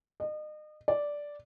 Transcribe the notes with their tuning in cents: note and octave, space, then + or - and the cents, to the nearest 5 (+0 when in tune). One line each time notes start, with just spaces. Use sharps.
D#5 -35
D5 -5